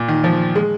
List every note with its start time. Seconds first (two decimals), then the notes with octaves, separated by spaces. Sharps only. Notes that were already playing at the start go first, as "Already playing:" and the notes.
Already playing: A#2
0.08 D#3
0.24 F3
0.56 G#3